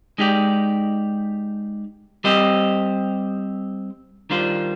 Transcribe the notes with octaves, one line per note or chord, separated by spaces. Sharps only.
G#3 D#4 G4 D5
G3 C4 G4 C5 D#5
D#3 G3 D4 F4 C5